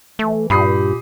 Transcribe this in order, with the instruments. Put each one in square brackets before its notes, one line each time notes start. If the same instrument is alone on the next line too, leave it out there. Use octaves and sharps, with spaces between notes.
[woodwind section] E3 [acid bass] A3
[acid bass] G2 [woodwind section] A#2 G4 [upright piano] B5 D#6 C7